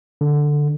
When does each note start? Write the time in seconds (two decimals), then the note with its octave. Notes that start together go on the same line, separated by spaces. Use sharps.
0.21 D3